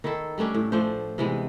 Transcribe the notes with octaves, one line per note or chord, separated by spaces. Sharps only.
D#3 E4 A4
G3 A3 C#4 D4
A2
F3 A3 D4 C5
C3 E3 G#3 B3